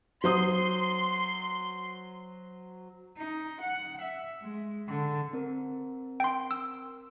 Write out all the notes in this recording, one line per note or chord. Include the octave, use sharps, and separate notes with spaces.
F#3 C5 C6 D#6
D#4
F#5
E5
G#3
D3
C4 A#4
G5 C6
E6